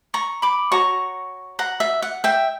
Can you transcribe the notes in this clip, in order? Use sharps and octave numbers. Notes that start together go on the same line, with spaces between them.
A#5 C#6
B5 D6
F#4 C#5 A#5 C#6
F#5 A#5
E5
F#5
E5 G5